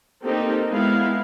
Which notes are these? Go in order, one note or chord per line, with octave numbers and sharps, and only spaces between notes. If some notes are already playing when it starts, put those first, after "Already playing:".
A#3 C4 D#4 G4 A4
G#3 B3 E4 F5